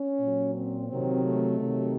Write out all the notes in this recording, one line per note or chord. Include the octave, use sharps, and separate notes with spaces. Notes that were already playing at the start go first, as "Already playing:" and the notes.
Already playing: C#4
A#2 F#3
C4
C3 D#3 F#3 C4
A3
C3 D#3 F#3